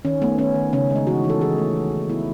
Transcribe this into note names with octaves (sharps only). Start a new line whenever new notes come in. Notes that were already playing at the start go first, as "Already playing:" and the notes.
D#3 C#4
A3 B3
D#3 C#4
D#3
C#3 C#4
G#3
D#4
E3 F#4
E3
A4
E3 G#4
A3
E3
E3
B3 E4